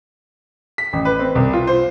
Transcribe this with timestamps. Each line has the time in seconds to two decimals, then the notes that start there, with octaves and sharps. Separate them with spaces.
0.78 B6
0.93 A1
1.05 B4
1.19 C4
1.35 C2
1.53 F4
1.67 C5